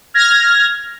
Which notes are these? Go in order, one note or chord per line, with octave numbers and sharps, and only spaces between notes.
F6 G#6 A#6